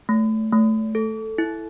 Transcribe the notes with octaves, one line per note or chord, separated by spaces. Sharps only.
A3
A3
A4
E4